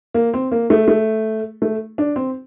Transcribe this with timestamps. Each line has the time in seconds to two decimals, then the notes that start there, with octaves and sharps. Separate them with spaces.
0.14 A#3
0.34 C4
0.52 A#3
0.70 A3
0.88 A3
1.62 A3
1.98 D4
2.16 C4